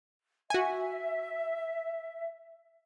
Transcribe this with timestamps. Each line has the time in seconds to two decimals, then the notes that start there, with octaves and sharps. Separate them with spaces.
0.50 F#4 E5 G#5